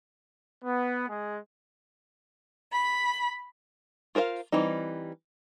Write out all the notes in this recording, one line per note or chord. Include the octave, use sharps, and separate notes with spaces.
B3
G#3 G#4
B5
F4 A#4 C5 C#5 F5
E3 G3 C4 D#4